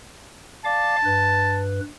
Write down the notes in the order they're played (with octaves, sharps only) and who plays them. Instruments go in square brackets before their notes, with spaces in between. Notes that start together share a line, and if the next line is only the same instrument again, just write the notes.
[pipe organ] D5 F5 D6 [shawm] A5
[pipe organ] G2 B4